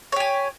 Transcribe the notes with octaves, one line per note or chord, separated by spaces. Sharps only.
G4 C#5 G#5